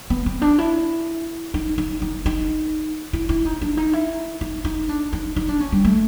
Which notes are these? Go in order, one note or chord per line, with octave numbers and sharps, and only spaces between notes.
B3
C4
D4
E4
D#4
D#4
D#4
D#4
E4
E4
D#4
D4
D#4
E4
D#4
D#4
D4
D#4
D#4
D4
C#4
G3
A3